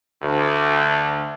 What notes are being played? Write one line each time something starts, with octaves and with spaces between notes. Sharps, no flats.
D2